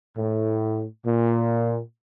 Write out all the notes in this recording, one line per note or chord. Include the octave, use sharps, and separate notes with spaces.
A2
A#2